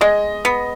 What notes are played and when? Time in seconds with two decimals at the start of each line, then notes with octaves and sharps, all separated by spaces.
0.01 G#3 D#5
0.45 B3